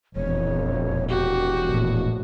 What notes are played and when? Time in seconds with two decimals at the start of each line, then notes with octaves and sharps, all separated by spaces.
0.16 E1 A#1 F2 C#5
1.09 F#4 G4
1.66 A#1 A2